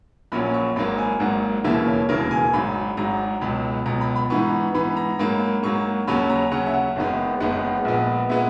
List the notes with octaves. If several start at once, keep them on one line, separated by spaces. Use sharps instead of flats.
A#1 A#2 F#3 C#4 B5
C#6
G#1 G#2 F#3 A#3 B5
G#5
G#1 G#2 F#3 A#3 F#5
E1 D#2 C#3 E3 A#3 E5
C#5
E1 D#2 C#3 E3 A#3 A#4
G#5
G#1 G#2 F#3 B5
G#1 G#2 F#3 A#5
C#2 B2 F#3 B5
C#2 B2 F#3 A#5
B5
B5
G#2 E3 B3 C#6
G#2 E3 B3 B5
A#5
G#2 F#3 A#3 B5
G#2 F#3 A#3 C#6
D#2 C#3 F#3 C#4 B5
A#5
D#2 C#3 F#3 C#4 F#5
E5
F#5
F#1 F#2 D#3 G#3 B3
F#1 F#2 D#3 G#3 B3 F#5
A#1 A#2 G#3 B3
A#2 G#3 B3 E5